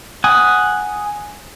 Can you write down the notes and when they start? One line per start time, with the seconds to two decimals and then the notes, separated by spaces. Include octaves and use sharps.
0.24 F#5 G#5 D#6